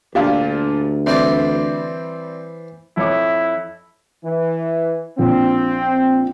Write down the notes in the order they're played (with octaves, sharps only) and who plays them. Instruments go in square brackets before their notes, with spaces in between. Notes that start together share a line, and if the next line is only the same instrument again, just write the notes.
[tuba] D2 [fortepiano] A#2 F3 D4 [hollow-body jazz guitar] G4 F5
[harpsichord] E3 C5 D5 [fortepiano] G3 C4
[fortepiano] F2 C#5 D6 [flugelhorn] E4
[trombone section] E3
[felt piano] A#1 [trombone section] C4